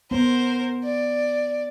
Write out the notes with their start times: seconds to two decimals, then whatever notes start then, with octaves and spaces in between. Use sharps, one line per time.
0.11 B3 A#4 C5
0.84 D5